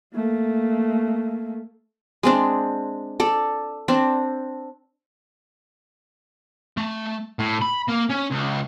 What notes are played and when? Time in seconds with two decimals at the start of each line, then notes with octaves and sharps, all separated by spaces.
0.14 A3 A#3
2.23 G#3 C4 D4
3.20 A4 D5
3.88 C4 D4
6.77 A3
7.39 A2
7.61 B5
7.88 A#3
8.09 C#4
8.30 C#2